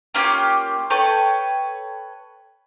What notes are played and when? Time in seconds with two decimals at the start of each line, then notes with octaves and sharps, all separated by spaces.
0.14 A#3 C#4 F4 G4
0.90 A4 B4 C#5 G5